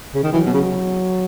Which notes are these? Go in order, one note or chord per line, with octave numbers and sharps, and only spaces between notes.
C#3
D#3
E3 F#3
B2
C#3